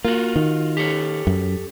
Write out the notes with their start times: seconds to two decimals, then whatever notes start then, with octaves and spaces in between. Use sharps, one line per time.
0.05 A#3 F4 F#4
0.36 D#3
0.77 G4 A4 C#5
1.27 F#2